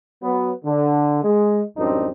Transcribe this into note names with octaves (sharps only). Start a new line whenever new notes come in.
F#3 B3
D3
G#3
A1 F#2 G3 C4 D4 D#4